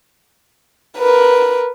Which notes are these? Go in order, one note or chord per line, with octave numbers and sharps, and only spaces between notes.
A#4 B4